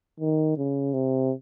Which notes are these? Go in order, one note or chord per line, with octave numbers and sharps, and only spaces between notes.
D#3
C#3
C3